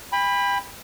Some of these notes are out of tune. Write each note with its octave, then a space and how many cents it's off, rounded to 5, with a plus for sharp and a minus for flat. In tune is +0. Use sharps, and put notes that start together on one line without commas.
G5 +40 B5 +0